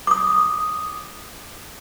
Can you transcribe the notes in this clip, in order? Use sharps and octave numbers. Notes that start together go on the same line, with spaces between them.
D6 D#6